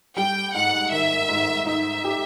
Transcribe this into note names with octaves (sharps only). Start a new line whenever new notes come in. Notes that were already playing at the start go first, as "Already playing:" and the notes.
G3 G5
G#2 F#5
D#3 E5
G#2
D#4 E5
G4